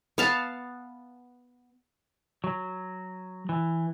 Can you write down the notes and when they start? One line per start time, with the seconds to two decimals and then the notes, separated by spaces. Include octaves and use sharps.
0.18 B3 F5 A5
2.44 F#3
3.49 E3